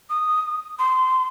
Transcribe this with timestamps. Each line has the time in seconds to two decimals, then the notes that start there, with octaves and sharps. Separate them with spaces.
0.10 D#6
0.79 C6